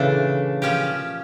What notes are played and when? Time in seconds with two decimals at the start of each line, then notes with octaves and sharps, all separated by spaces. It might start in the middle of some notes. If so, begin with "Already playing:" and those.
Already playing: A#2 C#3 E3 A3 D4 A4
0.62 F3 C#4 G4